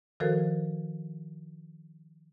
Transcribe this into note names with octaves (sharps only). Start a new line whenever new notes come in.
D#3 F3 F#4 A4 A#4 C5